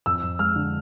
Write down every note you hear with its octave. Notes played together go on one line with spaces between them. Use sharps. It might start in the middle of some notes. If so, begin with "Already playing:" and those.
F2 E6
F2
G#3 F6
D3